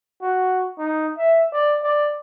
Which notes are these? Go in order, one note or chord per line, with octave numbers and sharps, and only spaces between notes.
F#4
D#4
E5
D5
D5